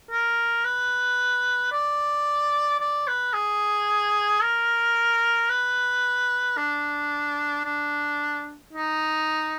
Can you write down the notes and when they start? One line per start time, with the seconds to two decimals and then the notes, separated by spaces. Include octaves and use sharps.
0.11 A#4
0.65 B4
1.72 D5
2.80 D5
3.08 B4
3.34 G#4
4.42 A#4
5.49 B4
6.57 D4
7.65 D4
8.73 D#4